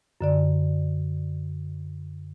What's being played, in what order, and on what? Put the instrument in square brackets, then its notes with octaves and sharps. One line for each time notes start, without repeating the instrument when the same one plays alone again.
[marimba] F#2 D3 D5